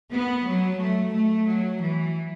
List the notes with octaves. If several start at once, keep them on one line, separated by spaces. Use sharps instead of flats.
B3
F#3
A3
A3
F#3
E3